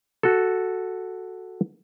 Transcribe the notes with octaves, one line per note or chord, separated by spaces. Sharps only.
F#4 A4